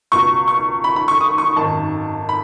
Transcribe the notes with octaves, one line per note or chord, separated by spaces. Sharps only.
C#2 B2 C#6
C#6
B5
B5
C#6
D#6
C#6
G#1 F#2 D#3 A5
B5